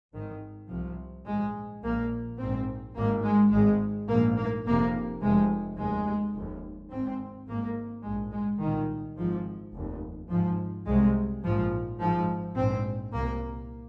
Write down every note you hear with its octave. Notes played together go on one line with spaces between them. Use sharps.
G#1 G#2 D#3
C2 C3 F3
A#1 G#2 G#3
A#1 A#2 A#3
A#1 G#2 C4
G#1 G#2 A#3
G#3
G#1 G#2 G#3
A#1 G#2 A#3
A#3
F1 F2 C3 A#3
F1 F2 C3 G#3
F1 D#2 G#3
F1 D#2
G#1 G#2 C4
G#1 G#2 A#3
A#1 G#2 G#3
G#3
C2 A#2 D#3
G#1 G#2 F3
F1 D#2
G#1 G#2 F3
C2 C3 G#3
A#1 G#2 F3
G#1 G#2 F3
A#1 G#2 C4
C2 A#2 A#3